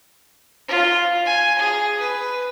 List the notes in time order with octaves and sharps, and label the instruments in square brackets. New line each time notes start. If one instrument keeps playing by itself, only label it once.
[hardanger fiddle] F4
G#5
G#4
B4